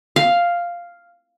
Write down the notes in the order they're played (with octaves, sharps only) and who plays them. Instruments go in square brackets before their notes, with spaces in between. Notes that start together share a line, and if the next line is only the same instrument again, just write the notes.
[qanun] F5